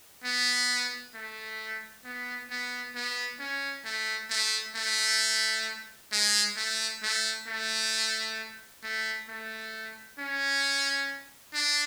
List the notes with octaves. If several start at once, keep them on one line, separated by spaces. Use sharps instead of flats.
B3
A3
B3
B3
B3
C#4
A3
A3
A3
G#3
A3
A3
A3
A3
A3
C#4
D4